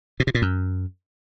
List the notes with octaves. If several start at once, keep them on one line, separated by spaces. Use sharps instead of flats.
B2
C3
A#2
F#2